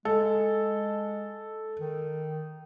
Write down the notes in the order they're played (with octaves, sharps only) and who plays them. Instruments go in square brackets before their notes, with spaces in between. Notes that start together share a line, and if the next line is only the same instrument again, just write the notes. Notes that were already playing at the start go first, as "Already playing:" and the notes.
[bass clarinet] G#3 [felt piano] A4
[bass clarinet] D#3